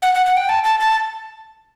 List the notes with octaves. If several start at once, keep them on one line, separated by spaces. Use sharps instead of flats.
F#5
F#5
F#5
G5
A5
A5
A5